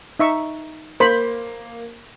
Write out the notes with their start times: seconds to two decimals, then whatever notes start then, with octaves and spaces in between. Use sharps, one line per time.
0.20 D#4 E5 C#6
1.00 A#3 C5 B5